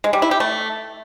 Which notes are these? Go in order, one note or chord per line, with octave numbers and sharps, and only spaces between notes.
G#3
G3
E4
G4
A3